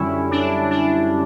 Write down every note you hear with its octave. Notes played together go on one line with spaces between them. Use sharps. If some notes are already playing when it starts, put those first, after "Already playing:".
Already playing: F#2 D3 G3 C#4 E4
D4
D4